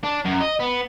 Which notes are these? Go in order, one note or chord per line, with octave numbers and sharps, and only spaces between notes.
D4
F#2
D#5
B3